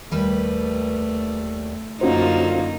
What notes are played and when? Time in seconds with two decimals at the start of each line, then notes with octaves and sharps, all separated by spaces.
0.12 D#2 G3 A3 B4
2.01 F#2 D3 A#3 C#4 D#4 F4 F#4 C5